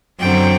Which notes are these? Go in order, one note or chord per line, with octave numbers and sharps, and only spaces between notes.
F#2 D3 F#3 C4 G5